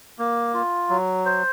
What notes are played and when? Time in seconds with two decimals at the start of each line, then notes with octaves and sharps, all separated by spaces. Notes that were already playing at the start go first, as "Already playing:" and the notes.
0.19 A#3
0.54 F4
0.90 F#3
1.26 C5